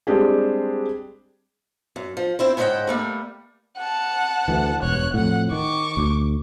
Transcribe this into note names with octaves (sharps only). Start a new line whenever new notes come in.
G3 G#3 C4 D4 G4 G#4
F#2
F3
C4 E4 C5
G#2 C#3 C5 D#5 F#5 G5
G3 A3 A#3
F#5 A5
D2 E3
E1 G2 C#5 F#6
F2 A2 F#5
D#3 C#6 D6
D2